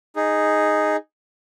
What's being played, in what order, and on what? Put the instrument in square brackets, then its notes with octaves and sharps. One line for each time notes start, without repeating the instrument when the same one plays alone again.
[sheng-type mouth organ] D#4 G#4